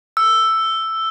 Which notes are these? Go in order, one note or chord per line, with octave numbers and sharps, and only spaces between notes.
E6